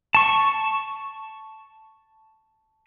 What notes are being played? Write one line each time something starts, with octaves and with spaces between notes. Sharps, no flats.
A5 C#6